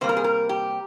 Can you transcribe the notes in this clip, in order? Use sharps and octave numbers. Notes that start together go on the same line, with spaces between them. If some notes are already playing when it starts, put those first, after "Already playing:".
C3 G3 A#3 C5
A#4
G#4
A#4
G4